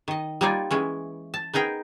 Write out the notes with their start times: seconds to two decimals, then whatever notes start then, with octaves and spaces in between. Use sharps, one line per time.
0.08 D#3 D#5
0.41 G3 A#3 D#4 F4 D5 G#5
0.71 E3 G#3 C#4
1.34 A5
1.54 B3 D#4 G#4 A#4 G5